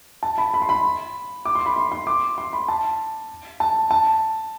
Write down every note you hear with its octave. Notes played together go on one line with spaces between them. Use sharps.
A5
B5
B5
C6
B5
D6
C6
B5
C6
C6
D6
C6
B5
A5
A5
A5